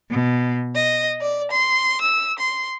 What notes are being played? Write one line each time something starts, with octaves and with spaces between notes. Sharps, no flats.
B2
D#5
D5
C6
E6
C6